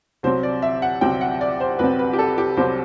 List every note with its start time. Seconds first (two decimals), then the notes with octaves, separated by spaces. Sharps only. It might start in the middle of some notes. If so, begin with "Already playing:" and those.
0.23 C2 C3 F#3 C4 C5
0.43 D5
0.62 E5
0.82 F#5
1.01 C2 C3 F#3 C4 G5
1.21 F#5
1.41 D5
1.60 C5
1.79 C2 C3 F#3 C4 B4
1.99 B4
2.13 G4
2.19 A4
2.38 G4
2.57 C2 C3 F#3 C4 C5